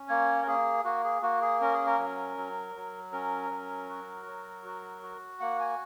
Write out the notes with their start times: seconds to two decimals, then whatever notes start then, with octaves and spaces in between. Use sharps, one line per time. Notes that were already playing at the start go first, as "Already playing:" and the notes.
Already playing: C#4
0.08 A#3 C#5
0.42 A#4
0.47 A#3 G#4
0.85 A#3 F#4
1.04 G#4
1.22 A#3 F#4
1.41 G#4
1.61 C#4 A#4
1.73 G#4
1.86 A#4
1.98 F#3
2.37 F#3
2.75 F#3
3.12 C#4 A#4
3.51 F#3
3.89 F#4
4.26 F#3
4.65 F#4
5.02 F#4
5.40 A#3 F#5
5.60 G#5